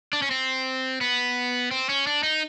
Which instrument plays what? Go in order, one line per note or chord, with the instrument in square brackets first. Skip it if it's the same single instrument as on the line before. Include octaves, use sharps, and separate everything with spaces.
[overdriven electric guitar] D4
C#4
C4
B3
C4
C#4
D4
D#4